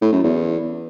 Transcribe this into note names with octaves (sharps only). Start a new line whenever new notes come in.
A2
F#2
E2